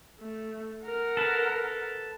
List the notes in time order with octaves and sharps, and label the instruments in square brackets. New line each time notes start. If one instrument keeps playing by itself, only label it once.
[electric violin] A3
A#4 F#5
[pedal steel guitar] A4 B4